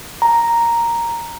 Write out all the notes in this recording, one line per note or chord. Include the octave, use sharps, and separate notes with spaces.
A#5